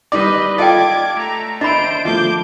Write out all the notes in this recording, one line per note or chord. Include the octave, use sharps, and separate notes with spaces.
G3 D#4 B4 D5 D#5 D6
F4 A4 D5 D#5 G5 D6 G#6
A3 A#5
D4 C5 D#5 E5 B5 D7
F3 A3 D6 G6